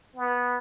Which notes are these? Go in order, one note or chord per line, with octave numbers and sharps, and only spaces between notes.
B3